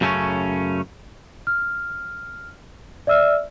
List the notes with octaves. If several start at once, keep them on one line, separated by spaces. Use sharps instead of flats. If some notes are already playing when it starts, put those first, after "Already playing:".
F#2 C#3 A3 C4 C#4
F6
D5 E5 E6 F6